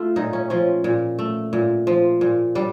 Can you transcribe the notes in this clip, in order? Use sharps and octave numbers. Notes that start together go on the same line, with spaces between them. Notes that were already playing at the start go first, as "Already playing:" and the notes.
Already playing: A3 F4
A#2 D#4
C#4
F3 C#4
A#2
A3
A#2
F3
A#2
G3 D4